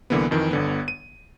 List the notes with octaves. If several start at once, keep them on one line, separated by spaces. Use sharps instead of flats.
C2 D3 E3 A#3 B3
F2 D#3 E3
G1 D3 B3
D#7